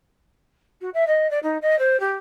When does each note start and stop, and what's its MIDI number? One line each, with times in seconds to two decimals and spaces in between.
0.81 0.89 66
0.94 1.07 76
1.07 1.29 75
1.30 1.39 74
1.43 1.57 63
1.62 1.78 75
1.78 1.99 72
2.00 2.15 67